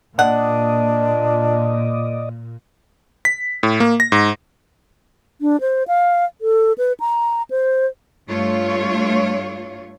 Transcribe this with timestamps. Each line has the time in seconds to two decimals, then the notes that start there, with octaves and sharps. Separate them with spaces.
0.19 A#2 D4 D5 D#5 F#5
3.25 B6
3.63 A2
3.80 A#3
4.00 A#6
4.12 G#2
5.41 D4
5.61 C5
5.88 F5
6.41 A4
6.78 B4
7.00 A#5
7.50 C5
8.28 G2 A3 F4 C#5